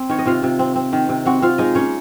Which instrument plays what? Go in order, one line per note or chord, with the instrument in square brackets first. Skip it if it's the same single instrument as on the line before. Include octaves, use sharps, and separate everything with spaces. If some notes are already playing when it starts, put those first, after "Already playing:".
Already playing: [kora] C4
D#3 C#5
D#5
C3 F4 F5
C3
C4
C4
D#3
C3
C4 F#4 F#5
C4 F4 F5
G#3 D#4 D#5
A#3 C#4 C#5